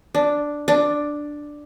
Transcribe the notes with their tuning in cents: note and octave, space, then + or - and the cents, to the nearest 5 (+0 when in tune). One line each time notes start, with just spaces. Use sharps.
D4 +0
D4 +5